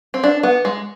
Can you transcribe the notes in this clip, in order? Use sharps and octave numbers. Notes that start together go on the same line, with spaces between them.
C4
D4
B3
G#3